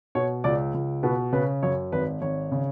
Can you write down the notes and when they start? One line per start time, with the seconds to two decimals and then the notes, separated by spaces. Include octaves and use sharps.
0.15 B2 C#5
0.44 C#2 D5
0.74 C#2
1.03 B2 B4
1.33 C#3 B4
1.63 F#2 C#5
1.92 G#1 B4
2.22 G#1 C#5
2.51 C#3